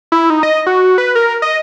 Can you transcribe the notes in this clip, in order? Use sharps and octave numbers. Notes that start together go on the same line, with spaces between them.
E4
D#4
D#5
F#4
B4
A#4
D#5